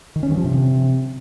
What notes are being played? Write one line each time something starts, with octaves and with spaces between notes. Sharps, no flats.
D#3
C#4
G2
F3
C3